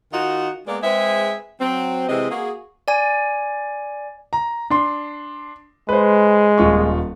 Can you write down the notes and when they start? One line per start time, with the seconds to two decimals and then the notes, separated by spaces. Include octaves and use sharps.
0.13 D#3 D#4 F4 F#4
0.67 G#3 A#3 B3 A#4 D5
0.83 G#3 C4 G#4 B4 E5
1.61 F#3 C4
2.09 C3 E3 G#3 C4 D#5
2.31 A#3 F#4 G#4
2.88 D5 G#5
4.33 A#5
4.70 D4 C6
5.89 G#3 B4 C5
6.58 D#1 F4 C#6